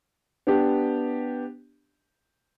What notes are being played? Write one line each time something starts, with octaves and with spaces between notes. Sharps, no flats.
B3 D4 G4